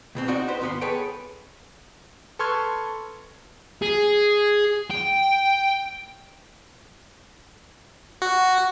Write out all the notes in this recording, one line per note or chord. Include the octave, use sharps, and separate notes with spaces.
C#2 B2 C4
C4 D#4 F#4 D5 D#5
G4 B4 C5
D#2 G#2 B3 F#4 B4 C6
G#4 A4 B4 C#5 F#5 G5
A4 B4 C6 C#6 F6 G#6
G#4
G5
F#4